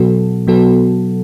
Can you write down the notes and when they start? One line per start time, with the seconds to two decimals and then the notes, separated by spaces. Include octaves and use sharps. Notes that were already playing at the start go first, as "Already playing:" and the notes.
Already playing: B2 F#3 B3 F#4 A4
0.47 B2 F#3 B3 F#4 A4